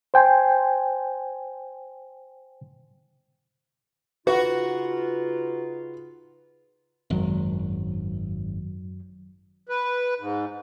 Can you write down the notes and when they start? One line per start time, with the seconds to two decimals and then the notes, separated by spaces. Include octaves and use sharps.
0.14 C5 G5 G#5 C6
4.27 C#3 D#4 F4 F#4 B4
7.10 G#1 F#2 F#3
9.69 B4
10.20 G#2